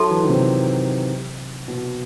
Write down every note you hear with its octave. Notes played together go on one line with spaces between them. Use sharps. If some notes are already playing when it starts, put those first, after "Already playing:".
Already playing: F#3 D#4 A4 E5 A5 C6
E3
D#3
C3
B2